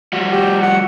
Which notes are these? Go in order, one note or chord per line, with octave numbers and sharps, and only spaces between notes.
F3 G3 F#4
G4
F#5